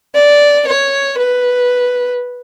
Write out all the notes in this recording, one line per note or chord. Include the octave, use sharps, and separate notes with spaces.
D5
C#5
B4